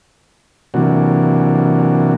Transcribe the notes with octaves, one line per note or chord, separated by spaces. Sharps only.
C3 E3 F#3 A#3 D4 F#4